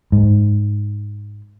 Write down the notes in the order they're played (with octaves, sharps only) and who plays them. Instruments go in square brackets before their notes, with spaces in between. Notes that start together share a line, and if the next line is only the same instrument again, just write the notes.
[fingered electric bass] G#2